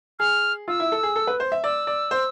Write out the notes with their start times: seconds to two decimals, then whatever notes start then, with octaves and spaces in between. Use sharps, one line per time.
0.19 G#4 F6
0.68 F4 E6
0.80 E4
0.92 A4
1.03 G#4
1.16 A4
1.27 B4
1.40 C5
1.52 E5
1.64 D5 E6
1.87 D5
2.11 C5